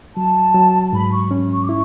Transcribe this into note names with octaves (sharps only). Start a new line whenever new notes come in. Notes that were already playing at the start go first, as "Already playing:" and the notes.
F#3 A5
F#3
G#2 B5
C#6
C#4
C#6
D6
E4 C#6